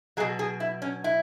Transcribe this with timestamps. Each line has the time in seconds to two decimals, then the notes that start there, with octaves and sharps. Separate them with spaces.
0.17 B2 F#3 G#4
0.39 G#4
0.60 E4
0.82 C#4
1.04 E4